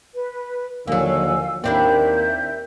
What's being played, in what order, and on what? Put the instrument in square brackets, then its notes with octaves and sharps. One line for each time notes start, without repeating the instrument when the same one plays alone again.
[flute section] B4
[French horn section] D#2 D3 F3 [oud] F#3 A#3 [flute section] F5 G#5 E6
[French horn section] D#2 A#3 A#4 [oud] C4 D4 E4 [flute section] E5 G6